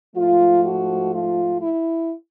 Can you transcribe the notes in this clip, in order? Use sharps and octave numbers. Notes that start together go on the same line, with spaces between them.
G#2 F3 A3 F4
F#4
F4
E4